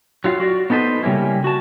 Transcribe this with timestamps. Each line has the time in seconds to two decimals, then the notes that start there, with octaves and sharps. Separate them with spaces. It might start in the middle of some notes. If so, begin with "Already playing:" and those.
0.24 F#3 F4 F5
0.40 F#4 D5
0.70 B3 D#4 A4 B4 C5
1.03 C#3 G3 A#3 C#4 E4
1.44 F#4 A5